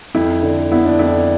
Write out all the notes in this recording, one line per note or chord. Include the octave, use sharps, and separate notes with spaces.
F2 E4
D3
B3 E4
D4
F2 E4